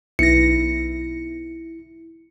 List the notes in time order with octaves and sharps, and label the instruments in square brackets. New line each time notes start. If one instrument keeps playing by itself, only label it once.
[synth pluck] B1 A#6 [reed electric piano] E4 [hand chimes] C#7